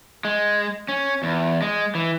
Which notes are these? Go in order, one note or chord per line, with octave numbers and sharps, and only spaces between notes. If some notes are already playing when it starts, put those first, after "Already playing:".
G#3
C#4
E2
G#3
E3